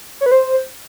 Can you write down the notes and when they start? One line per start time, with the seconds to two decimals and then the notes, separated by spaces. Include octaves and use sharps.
0.21 C#5
0.26 B4
0.32 C5